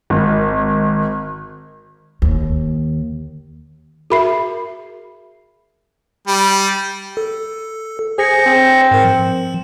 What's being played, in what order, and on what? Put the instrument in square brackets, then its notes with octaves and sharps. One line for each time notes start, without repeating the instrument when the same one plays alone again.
[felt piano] G#1
[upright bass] D#2
[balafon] F#4 A#4 E5 [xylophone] G#4 B5 C7
[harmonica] G3
[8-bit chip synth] A4
[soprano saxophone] G#4 [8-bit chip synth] C5 A#6 C#7
[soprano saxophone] C4
[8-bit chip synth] G#2 A#4
F3